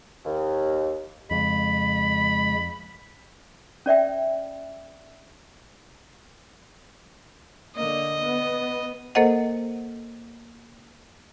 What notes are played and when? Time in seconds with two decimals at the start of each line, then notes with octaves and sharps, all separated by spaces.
0.25 D#2
1.31 F2 C#3 G#3 B5
3.86 C#4 D5 E5 G5
7.76 D3 A#3 D#5
8.21 B3
9.15 A#3 A4 A#4 C5 D#5 F#5